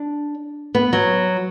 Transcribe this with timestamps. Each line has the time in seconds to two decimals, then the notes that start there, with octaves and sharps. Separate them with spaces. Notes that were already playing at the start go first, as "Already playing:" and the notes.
Already playing: D4
0.75 B3
0.93 F#3